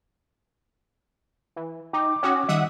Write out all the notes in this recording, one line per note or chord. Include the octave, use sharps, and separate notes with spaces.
E3
D#4 G5 D6
C#4 F#4 G5 D#6
D#3 G3 D#5 E5 F#5 D#6